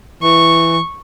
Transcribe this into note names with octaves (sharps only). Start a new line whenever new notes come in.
E3 C#6